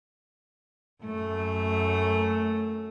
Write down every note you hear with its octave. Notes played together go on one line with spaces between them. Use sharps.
F#2 A3